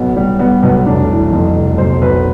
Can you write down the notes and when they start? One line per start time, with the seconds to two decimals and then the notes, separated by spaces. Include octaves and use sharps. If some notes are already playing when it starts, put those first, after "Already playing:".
Already playing: B1 B3
0.16 G3
0.39 G3 B3
0.63 B1 B3
0.86 F1 D4
1.09 E3
1.33 F2
1.56 F1
1.78 B1 C5
2.01 B1 B4